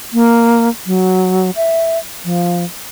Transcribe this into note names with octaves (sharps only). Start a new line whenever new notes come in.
A#3
F#3
E5
F3